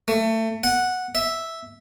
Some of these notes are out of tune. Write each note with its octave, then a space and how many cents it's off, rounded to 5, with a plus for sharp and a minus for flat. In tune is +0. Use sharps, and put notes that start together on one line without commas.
A3 +25
F#5 -5
E5 -5